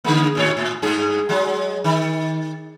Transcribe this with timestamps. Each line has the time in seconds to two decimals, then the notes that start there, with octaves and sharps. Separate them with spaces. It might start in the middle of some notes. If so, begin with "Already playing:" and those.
0.04 D3 G#3 A#3
0.35 D#2 A2 C#5
0.57 A2
0.82 G2 G#4
1.29 F#3 G#3
1.84 D#3